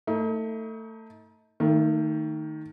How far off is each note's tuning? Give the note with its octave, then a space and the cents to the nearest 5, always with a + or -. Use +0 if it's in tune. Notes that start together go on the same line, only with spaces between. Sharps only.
A3 +25 D#4 +40
D#3 +0 A3 +40